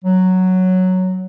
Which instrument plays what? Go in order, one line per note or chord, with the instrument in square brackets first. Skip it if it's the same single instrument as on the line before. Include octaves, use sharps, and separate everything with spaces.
[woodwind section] F#3